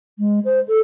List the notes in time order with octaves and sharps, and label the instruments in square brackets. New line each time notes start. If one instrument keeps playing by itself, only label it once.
[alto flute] G#3
C5
A4